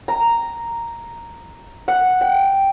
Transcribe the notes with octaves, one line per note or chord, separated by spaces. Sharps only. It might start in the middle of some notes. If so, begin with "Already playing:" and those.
A#5
F#5
G5